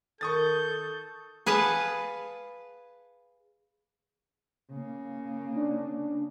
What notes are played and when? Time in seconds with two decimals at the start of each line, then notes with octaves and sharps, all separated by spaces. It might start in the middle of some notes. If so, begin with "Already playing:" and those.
0.21 D#3 A4 C#6 D#6 G6 A6
1.46 G#4 B4 F5 F#5 A5
4.71 C#3 A#3
5.56 D4